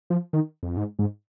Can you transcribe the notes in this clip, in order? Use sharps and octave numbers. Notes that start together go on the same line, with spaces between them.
F3
D#3
F2
G#2
G#2